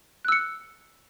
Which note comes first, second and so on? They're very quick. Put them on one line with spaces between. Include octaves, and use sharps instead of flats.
F#6 E6 C#7